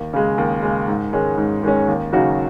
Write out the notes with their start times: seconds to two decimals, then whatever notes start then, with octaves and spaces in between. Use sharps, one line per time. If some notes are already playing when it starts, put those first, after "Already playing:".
Already playing: D#2
0.13 C#3 G#3
0.38 D#2
0.62 C#3 G#3
0.88 G#2
1.13 D#3 G#3 C#4
1.38 G#2
1.63 D#3 G#3 C#4
1.88 D#2
2.13 C#3 F#3 D#4 F#4